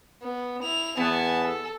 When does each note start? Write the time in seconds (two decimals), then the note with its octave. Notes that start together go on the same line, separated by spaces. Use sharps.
0.22 B3
0.63 E4 F7
0.98 E2 B3 G#5 A5
1.45 A4